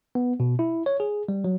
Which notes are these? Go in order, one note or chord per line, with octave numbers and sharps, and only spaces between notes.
B3
B2
E4
C#5
G#4
G3
F#3